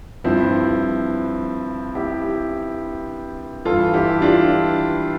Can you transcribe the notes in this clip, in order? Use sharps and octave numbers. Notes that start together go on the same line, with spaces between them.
G2 F3 C4 E4
E4 G4
G2 E3 F4 A4
E4 G4
D4 F4